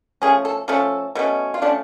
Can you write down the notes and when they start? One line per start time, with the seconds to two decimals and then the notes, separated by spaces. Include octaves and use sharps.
0.22 F3 A3 C#4 G#4
0.45 A4
0.68 F3 A3 C#4 A4
1.15 B2 A3 C#4
1.54 F4
1.62 F3 A3 C#4 D4